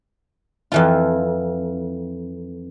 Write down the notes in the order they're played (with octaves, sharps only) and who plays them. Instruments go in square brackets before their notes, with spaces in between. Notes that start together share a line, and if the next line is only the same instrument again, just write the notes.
[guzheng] F2 E3 F4